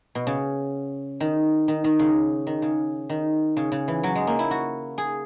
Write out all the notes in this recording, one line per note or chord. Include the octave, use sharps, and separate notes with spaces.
B2
C#3
D#3
D#3
D#3
C#3
D#3
C#3
D#3
C#3
C#3
E3
F#3
G#3
A#3
E4
F#4
G#4